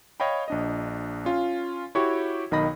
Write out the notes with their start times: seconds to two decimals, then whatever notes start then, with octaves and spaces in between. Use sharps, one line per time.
0.20 C#5 D#5 F5 G5 B5
0.48 A#1 D4 D#5
1.25 C#4 F4 F5
1.95 E4 F#4 G4 C#5 G5 C#6
2.51 B1 D#3 D#4 D#5 B5 A#6